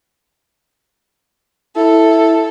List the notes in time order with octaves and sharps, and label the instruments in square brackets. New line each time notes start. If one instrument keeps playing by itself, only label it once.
[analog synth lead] E4 [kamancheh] A4